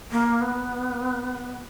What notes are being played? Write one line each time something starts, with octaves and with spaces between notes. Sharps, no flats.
A#3
B3